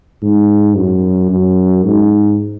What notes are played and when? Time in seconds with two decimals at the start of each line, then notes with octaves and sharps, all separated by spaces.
0.22 G#2
0.76 F#2
1.30 F#2
1.84 G#2